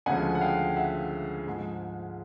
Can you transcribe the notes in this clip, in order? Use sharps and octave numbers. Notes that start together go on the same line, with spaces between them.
D2 C#3 F3 G#3 F#5 G#5
F#5
F5 G5
E5 F#5
G#2 F3 G#3